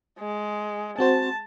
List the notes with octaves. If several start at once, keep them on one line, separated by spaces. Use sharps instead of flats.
G#3
C4 F#4 C5 A5